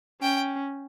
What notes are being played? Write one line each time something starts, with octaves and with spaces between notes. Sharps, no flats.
C#4 G5